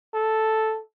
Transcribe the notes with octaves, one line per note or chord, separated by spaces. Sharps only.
A4